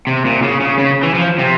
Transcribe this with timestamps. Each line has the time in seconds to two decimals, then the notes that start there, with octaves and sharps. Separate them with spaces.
0.07 C3
0.25 A#2
0.43 C#3
0.60 C#3
0.79 C#3
1.03 E3
1.14 F3
1.39 C3